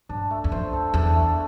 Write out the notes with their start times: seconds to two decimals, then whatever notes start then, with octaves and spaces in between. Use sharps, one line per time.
0.09 G2 D4
0.31 A3
0.44 E2
0.52 F2 C5
0.73 A4
0.94 E2 D4
1.15 A3